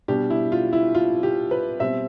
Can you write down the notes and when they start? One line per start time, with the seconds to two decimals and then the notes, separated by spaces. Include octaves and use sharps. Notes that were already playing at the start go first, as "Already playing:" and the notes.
0.08 B2 G3 D4 G4
0.30 E4
0.52 F4
0.73 E4
0.95 F4
1.23 G4
1.51 B4
1.80 B2 G3 C4 E5